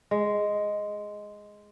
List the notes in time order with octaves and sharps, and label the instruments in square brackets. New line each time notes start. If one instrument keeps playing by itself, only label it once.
[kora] G#3